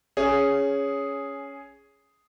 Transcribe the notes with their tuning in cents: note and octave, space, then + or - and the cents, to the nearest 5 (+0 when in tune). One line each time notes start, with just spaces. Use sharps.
C#4 +10 G#4 +0